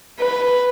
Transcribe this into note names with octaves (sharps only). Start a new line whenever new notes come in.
B4